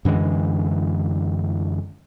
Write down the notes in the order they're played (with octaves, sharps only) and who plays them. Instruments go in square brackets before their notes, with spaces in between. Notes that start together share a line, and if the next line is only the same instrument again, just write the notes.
[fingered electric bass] F#2 D3 E3 G#3